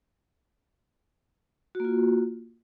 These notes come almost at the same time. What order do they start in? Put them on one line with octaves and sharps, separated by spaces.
F#4 A#3 F4